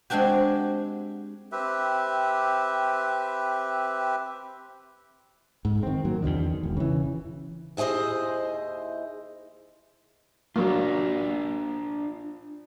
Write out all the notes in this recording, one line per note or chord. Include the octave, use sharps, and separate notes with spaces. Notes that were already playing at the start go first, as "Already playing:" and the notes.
G#3 C4 D4 F#4 G4
C4 G4 B4 E5
G#2
D#3 C4
F#3 A#3
E2 B2 D3 D#3
E1
C#3 E3
D#2 E4 G#4 C5 D#5
F#3 A#3 D4 F4